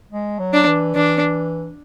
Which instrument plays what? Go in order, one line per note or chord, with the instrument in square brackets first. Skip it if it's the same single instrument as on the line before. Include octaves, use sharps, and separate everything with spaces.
[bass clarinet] G#3
F#3
[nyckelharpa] D4
[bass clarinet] E3
[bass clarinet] E3 [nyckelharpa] D4